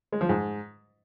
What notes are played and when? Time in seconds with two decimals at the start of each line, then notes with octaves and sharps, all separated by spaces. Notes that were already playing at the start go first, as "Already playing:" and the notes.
0.12 G#3
0.21 F3
0.29 G#2